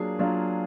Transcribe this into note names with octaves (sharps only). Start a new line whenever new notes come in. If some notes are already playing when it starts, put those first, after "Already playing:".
Already playing: F#3 A#3 D4 F4 G#4
F#3 A#3 D4 F4